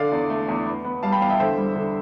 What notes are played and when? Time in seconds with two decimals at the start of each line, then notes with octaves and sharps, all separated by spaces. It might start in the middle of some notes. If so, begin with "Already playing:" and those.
Already playing: D3 D5 F5
0.12 E2
0.30 A3
0.48 E2
0.66 B3
0.84 B3
1.03 G3 F5 A5
1.12 G5 B5
1.21 E2 F5 A5
1.30 E5 G5
1.40 D3 C5 E5
1.57 G3
1.76 D3